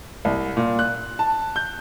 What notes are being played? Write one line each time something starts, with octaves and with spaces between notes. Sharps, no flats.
C2
A#2
F#6
A5
G6